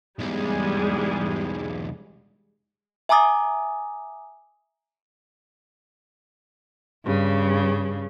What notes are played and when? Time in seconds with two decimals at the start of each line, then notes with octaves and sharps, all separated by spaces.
0.19 B1 E2 G3 G#3 G#4
3.09 E5 G#5 A#5 D6 D#6 A6
7.05 G2 C#3